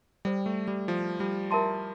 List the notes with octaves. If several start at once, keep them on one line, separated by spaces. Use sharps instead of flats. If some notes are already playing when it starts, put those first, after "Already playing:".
G3 A4 C5 G5
A3
G3
F3
G3
E4 A#4 E5 A5 C6